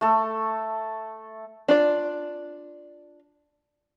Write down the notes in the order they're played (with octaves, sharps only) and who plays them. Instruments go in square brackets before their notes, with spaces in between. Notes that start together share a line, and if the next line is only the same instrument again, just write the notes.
[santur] A3 A4
[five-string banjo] D4 F4 D5